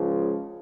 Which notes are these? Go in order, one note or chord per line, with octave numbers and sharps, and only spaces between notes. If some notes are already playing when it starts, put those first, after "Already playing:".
Already playing: C#2 C#3 F3